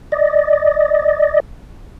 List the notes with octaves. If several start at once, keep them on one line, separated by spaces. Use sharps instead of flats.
D5 D#5